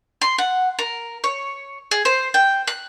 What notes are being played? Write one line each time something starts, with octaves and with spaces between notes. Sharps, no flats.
C6
F#5
A#4
C#5
G#4
C5
G5
F#6